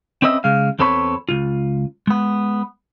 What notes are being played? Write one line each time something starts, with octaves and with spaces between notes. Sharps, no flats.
C4 C#4 B4 D#5 E5
C#3 G#3 F5
E2 C4 A4 B4 C#5 B5
C#2 F4
G#3 B3